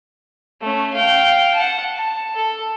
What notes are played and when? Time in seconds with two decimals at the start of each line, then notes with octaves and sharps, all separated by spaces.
0.61 A3 C#4
0.93 F5 G5
1.54 F#5 A5
1.96 A5
2.35 A4